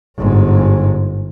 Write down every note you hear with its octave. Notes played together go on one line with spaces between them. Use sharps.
G1 G#2